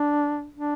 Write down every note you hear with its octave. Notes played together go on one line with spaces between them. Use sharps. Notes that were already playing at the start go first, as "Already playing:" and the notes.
Already playing: D4
D4